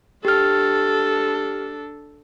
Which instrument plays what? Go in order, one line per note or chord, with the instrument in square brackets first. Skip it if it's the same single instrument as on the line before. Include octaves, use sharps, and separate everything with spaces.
[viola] D4 A4 [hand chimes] G4 F6